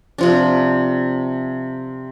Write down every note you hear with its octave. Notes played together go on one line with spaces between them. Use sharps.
C3 F3 D4